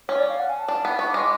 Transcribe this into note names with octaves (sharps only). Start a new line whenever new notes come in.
C#4 C#5
D5
F5
F#5
G#5
A5
D4
B3
B3 C#6
D6
G#3
D6